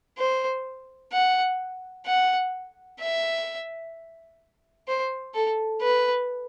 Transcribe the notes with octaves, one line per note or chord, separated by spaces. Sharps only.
C5
F#5
F#5
E5
C5
A4
B4